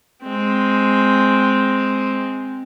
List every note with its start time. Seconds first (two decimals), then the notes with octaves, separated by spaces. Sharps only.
0.23 G#3 C4